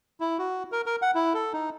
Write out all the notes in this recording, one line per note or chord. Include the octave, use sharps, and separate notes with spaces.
E4
F#4
A#4
A#4
F#5
E4
A4
D#4